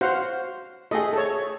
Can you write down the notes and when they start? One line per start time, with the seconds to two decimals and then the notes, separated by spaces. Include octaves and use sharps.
0.01 F#4 C5 F5 F#5
0.91 A3 G#4 D#5
1.13 A4 C#5